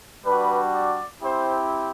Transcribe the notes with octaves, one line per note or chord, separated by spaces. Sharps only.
G3 D4 F#4 B4
D5
C4 E4 G4 C5